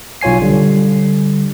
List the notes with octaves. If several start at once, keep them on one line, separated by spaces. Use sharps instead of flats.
B1 F4 C#5 G#5 C7
D3 G3